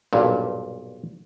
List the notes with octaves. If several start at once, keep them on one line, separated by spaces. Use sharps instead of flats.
B1 G2 A#2